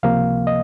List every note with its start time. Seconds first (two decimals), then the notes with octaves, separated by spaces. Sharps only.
0.03 C#2 C3 F3 A#3 F5
0.47 D#5